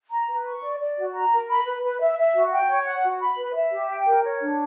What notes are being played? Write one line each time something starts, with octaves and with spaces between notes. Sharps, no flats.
A#5
B4
C#6
D5
D5
F#4
A#5
A#4
B5
B4
B4
E5
E5
F#4
G5
C#5
F#5
F#4
B5
B4
E5
G4
G5
A#4
C#5
D4